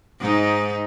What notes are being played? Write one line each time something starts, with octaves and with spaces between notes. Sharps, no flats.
G#2 D#4